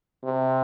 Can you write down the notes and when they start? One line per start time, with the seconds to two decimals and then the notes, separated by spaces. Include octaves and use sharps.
0.24 C3